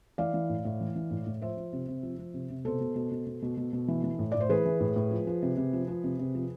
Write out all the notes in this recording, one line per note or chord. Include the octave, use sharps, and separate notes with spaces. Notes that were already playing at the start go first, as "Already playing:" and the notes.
E3 D5 F5
E3
A2
A2
E3
E3
A2
A2
F3 C5 E5
F3
C3
C3
F3
F3
C3
C3
B2 A4 C5
B2
B2
B2
B2
B2
B2
B2
E3
E3
A2
A2 D5
C5
E3 G#4 B4
E3
A2
A2
F3
F3
C3
C3
F3
F3
C3
C3
F3